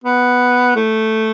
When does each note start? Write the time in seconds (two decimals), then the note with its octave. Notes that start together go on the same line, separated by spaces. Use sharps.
0.04 B3
0.76 A3